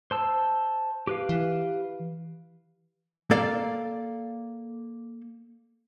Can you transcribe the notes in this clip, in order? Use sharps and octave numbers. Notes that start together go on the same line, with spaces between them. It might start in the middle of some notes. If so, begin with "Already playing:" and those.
C5 A5 E6
G4 B4 F5
E3
A#3 A4 D5 F5